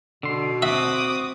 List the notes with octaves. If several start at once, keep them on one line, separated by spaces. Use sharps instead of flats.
B2 D3 C6
C4 F#4 E5 D6 D#6